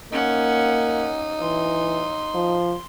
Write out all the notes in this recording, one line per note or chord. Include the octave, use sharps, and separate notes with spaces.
A#3 C#4 D#4 F#5
E3 C6
F3